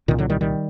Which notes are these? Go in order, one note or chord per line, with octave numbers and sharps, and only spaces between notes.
C2 A#2 D#3
D3 F#3
D#3 G3
D#3 G3